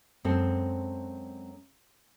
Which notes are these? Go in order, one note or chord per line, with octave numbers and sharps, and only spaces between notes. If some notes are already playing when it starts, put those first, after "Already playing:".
F#2 G#3 C4 A4